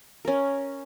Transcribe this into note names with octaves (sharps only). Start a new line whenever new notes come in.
C#4 A#4